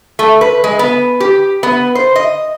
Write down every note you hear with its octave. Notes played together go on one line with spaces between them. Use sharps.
A3
B4
G#3
B3
G4
B3
C5
D#5